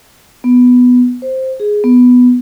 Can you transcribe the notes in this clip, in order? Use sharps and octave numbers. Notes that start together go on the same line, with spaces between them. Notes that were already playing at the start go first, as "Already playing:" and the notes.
B3
C5
G#4
B3